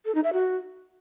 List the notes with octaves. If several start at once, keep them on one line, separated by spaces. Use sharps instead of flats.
A4
D#4
E5
F#4